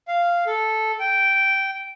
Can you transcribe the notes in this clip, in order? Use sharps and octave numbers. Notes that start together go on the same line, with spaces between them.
F5
A4
G5